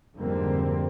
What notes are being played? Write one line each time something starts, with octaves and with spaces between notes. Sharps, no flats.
F2 G#2 D3 G3 A#3 C4